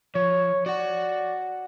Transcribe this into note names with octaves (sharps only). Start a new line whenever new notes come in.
F3 C#5
F#4 D5 F#5